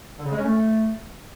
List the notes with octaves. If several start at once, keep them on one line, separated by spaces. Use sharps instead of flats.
D3
C#3
G#3
C#4
A3